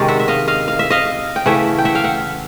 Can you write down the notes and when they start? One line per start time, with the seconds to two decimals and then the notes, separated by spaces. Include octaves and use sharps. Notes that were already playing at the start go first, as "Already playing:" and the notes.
Already playing: C3 D#3 G#3 C#4 D5
0.08 E5 F#5
0.20 E5
0.28 D#5 F5
0.48 D#5 F5
0.68 F5
0.79 E5
0.90 D#5 F5
1.36 G5
1.46 C#3 E3 A3 E5 F#5
1.78 G5
1.85 E5 F#5
1.95 F5 G5
2.04 E5 F#5